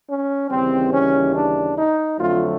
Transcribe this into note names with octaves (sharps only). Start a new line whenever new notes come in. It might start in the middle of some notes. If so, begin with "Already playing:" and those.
C#4
D#2 C#3 E3 G3 C4
C#4
D4
D#4
F2 D3 F#3 A3 C4 F4